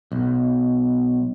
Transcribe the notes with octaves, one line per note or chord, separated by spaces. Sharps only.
B1